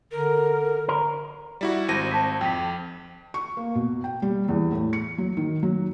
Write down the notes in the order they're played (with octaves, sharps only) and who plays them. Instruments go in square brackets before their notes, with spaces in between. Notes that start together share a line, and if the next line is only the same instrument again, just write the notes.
[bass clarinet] D3 [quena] A#4
[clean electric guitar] A#4
[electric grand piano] G3 E4 F#4
[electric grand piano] G#1 C4 A#6 [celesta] D#7
[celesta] A5 B6
[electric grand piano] F2 [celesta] G5 B6
[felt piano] C#6
A#3
B2
G5
G3
E2
A2
C#7
F#3
D#3
F#3